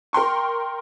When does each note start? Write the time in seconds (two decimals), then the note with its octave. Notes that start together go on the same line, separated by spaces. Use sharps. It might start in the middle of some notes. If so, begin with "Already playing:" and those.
0.13 A#4 G5 C6 C#6